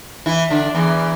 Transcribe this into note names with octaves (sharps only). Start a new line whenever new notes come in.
E3 E4
D3 D4
E2 E3